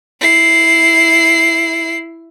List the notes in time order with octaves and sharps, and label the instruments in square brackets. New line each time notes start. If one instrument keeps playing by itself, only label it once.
[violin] E4 C7